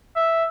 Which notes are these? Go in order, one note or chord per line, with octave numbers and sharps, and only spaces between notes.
E5